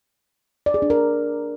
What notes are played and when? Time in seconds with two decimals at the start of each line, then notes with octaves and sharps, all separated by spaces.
0.66 D5
0.74 G#4
0.82 D4
0.90 A#4